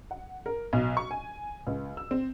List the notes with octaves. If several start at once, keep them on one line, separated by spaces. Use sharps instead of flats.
F#5
A#4
B1
C#6
G#5
C#2
E6
C4